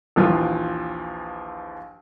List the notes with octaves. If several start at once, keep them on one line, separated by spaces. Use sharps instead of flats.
A#1 D#2 E3 F3 F4